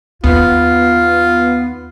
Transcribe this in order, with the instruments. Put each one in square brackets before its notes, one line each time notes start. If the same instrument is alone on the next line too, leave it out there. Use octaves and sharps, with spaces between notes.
[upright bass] D#2 [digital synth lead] B3 [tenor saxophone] F4